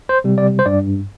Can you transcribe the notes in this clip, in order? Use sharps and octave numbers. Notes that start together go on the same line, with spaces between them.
C5
C3 G3
D5
C5
G2 D5